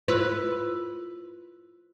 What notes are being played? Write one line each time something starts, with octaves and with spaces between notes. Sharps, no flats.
E4 F4 B4 E6